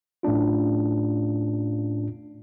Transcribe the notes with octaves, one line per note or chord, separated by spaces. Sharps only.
A2 A3 C#4 D4 F4